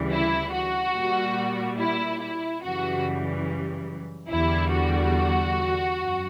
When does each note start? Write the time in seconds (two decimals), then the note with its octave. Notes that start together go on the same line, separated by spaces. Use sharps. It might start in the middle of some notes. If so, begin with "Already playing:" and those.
Already playing: D2 C#3 E3 G3
0.11 E4
0.53 F#4
0.94 A#2 G3
1.79 E4
2.20 E4
2.63 F#2 C#3 E3 G3 F#4
4.31 E2 D3 G3 E4
4.73 F#4
5.99 F#2